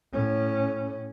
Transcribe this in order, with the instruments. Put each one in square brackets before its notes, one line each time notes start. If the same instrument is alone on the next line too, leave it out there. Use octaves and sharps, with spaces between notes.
[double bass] A2 C#4